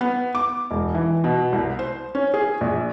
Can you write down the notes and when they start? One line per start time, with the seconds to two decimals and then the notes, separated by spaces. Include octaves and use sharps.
0.01 B3
0.35 D6
0.71 E1
0.95 E3
1.24 B2
1.53 C2
1.79 C5
2.15 C#4
2.34 G#4
2.61 A#1